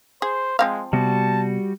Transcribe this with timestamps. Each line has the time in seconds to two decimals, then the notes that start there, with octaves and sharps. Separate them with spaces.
0.22 G#4 C5
0.59 F3 G#3 C4 F5
0.93 C3 G3 B3 F#4 A5